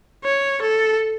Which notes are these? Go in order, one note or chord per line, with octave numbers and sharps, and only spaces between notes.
C#5
A4